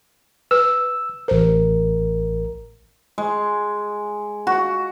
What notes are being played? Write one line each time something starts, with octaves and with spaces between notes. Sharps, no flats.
B4 E6
A1 A#4 C5
G#3
F#4